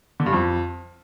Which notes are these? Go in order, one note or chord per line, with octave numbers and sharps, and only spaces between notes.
D3
G2
F2